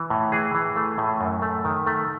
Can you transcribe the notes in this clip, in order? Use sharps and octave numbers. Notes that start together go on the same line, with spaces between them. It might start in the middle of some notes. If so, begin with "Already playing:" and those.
Already playing: E3
A2
E3 G#4
E3
A3
A2
F#2
A3
D#3
A3